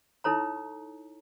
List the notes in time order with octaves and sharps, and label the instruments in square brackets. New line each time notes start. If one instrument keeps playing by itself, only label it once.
[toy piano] D#4 E4 A4 C#5 A#5